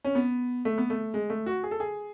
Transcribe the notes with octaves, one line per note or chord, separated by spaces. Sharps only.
C#4
B3
A3
B3
A3
G#3
A3
F#4
G#4
A4
G#4